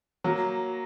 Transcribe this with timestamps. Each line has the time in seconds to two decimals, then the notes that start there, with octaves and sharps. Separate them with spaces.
0.24 F#3 A#3